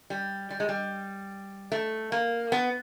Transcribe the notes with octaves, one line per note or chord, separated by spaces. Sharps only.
G3
G3
G#3
G3
A3
A#3
B3